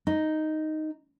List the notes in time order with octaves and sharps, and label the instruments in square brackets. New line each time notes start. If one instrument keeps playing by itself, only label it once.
[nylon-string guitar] D#4